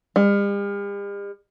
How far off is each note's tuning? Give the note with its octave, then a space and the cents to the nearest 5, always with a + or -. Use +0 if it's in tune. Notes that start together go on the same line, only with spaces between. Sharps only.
G3 +45